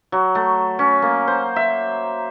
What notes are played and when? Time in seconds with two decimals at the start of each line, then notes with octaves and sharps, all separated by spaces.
0.12 F#3
0.35 A3
0.79 C#4
1.02 A#3
1.28 C5
1.56 E5